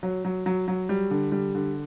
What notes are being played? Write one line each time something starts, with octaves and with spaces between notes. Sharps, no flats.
F#3
F#3
F#3
F#3
G3
D3
G3
D3